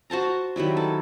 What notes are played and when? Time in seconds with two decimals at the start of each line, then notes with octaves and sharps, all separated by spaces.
0.10 F#4 C5 A5 A#5
0.56 D#3 F#3 G3 E4
0.77 A4 A5